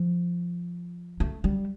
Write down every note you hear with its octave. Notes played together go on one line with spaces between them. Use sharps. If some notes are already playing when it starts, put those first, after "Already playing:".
Already playing: F3
A3
G3